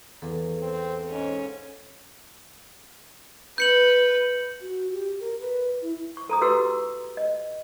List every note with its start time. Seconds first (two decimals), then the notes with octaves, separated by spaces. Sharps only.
0.22 E2 A4 F5
0.60 C4
1.09 G#2 C#4
3.58 B4 G6 C#7 F#7
4.61 F#4
4.92 G4
5.20 A#4
5.40 B4
5.82 E4
6.17 C#6
6.29 A4 A#5 D#6
6.41 E4 F#4 G4 B4 E6
7.17 D#5